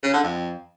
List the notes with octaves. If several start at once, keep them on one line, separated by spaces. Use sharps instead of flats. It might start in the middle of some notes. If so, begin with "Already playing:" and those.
C#3
D3
F2